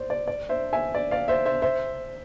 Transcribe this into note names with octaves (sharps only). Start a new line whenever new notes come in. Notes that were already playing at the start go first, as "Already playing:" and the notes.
Already playing: C5 D5
D5
D5
C5 E5
E5 G#5
D5
D5 F5
C5 E5
C5 E5
C5 E5